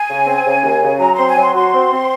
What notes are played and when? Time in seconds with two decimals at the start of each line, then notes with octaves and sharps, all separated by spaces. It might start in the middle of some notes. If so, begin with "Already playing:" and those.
Already playing: G#5
0.09 C#3
0.27 C4
0.45 C#3
0.63 D#2
0.82 C#3
0.99 F#3 A#5
1.13 C4 C6
1.28 G#5
1.37 F#3 C6
1.54 F#4 C6
1.73 C4
1.92 C4